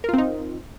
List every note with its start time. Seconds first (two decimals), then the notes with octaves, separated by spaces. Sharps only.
0.04 A#4
0.09 F4
0.13 C4
0.18 D#4